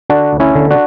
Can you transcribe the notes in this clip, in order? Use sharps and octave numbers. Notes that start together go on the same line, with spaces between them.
D3 D4 F#4
D2
C#4 E4
D3
D4 F#4